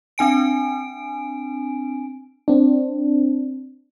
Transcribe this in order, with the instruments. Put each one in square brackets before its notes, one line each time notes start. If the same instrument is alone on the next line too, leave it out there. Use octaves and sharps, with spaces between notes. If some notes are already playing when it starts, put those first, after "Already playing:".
[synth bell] C4 D4 G#5 D7
[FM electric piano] C4 D4